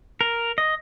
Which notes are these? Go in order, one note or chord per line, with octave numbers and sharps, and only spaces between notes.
A#4
D#5